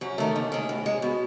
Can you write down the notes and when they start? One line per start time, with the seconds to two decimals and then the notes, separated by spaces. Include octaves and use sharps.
0.01 F#2 C#4
0.18 D#3 A3
0.36 D#2
0.52 D#3 G#3
0.69 A2
0.86 G#3
1.02 B2